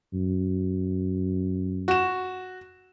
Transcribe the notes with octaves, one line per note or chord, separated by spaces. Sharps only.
F#2
F#4 E7